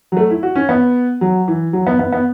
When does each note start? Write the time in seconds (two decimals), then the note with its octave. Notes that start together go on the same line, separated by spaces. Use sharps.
0.12 F#3
0.17 A3
0.30 E4
0.43 F#4
0.56 C#4
0.69 B3
1.21 F#3
1.48 E3
1.73 F#3
1.87 B3
1.99 B3
2.13 B3